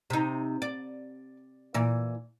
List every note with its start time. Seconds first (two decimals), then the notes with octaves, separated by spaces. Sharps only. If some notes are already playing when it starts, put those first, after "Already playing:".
0.10 C3 D#4
0.62 D5
1.74 A#2 E3